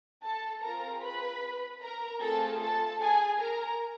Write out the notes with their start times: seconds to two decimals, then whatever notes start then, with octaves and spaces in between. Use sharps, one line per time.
0.24 A4 A5
0.63 C4 F4 G#4 A#4 A#5
1.03 B4 B5
1.82 A#4 A#5
2.21 A3 C4 F4 G#4 A4 A5
2.61 A4 A5
3.02 G#4 G#5
3.40 A#4 A#5